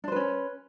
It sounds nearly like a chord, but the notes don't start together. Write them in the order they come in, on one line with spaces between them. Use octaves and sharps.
D4 C5 B4 C#4